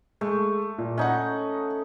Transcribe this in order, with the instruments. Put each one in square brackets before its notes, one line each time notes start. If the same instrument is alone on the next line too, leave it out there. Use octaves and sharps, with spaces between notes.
[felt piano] G#3 [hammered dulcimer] A3
[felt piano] A#2
[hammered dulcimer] C#4 D#4 [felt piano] D#5 F#5